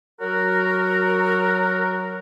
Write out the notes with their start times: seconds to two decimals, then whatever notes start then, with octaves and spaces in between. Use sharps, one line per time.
0.21 F#3 F#4 A#4